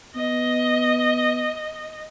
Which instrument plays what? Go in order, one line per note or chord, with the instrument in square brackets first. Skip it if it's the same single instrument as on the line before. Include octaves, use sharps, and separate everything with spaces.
[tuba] B3 [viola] D#5